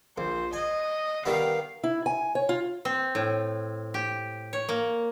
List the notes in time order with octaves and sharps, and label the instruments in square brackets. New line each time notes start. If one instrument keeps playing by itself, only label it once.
[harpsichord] A#1 [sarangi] C5
[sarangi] D#5 [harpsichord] G#5
[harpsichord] D#3 G3 B3 [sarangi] F5
[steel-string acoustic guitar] E4
G#5
C#5
F4
[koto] C4
A2
G4
C#5
A#3